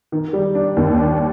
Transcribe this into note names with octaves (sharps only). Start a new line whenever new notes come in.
D#3
G3
D4
D#2
D4